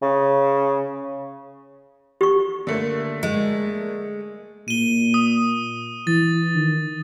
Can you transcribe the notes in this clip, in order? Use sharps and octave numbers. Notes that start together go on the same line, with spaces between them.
C#3
G4 C#6
D3 A3 A#3
G#3
A#2 D#7 G7
D#6
E3 A6
D#3